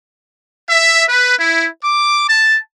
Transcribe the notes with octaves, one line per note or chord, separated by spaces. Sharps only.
E5
B4
E4
D6
A5